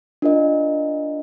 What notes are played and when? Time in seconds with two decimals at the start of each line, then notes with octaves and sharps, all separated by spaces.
0.22 D4 F4 A#4 D#5